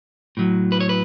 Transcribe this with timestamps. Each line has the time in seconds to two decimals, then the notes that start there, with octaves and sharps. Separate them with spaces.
0.37 A2 F#3
0.72 B4
0.80 C#5
0.89 B4